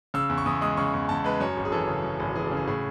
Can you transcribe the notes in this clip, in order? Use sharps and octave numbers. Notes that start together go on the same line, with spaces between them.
C#3 E6
E2
C#6
E2 D#6
G#3 D#6
C#3 C#6
E2
E2 A5
G#3 B4
F#2 C#5
G#1
G#4
E3 A4
C#3
F#2
G#1
E3 G#4
A4
C#3
G#4
A2 G#4